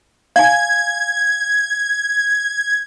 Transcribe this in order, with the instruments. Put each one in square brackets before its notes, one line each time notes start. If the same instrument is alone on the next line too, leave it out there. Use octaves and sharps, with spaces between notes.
[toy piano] F5 G#5 [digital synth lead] G#6